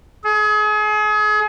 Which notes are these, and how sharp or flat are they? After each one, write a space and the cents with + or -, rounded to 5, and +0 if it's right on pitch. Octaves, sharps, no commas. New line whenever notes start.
G#4 +35